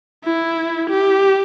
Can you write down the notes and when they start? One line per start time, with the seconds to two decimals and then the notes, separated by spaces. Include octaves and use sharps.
0.25 E4
0.90 G4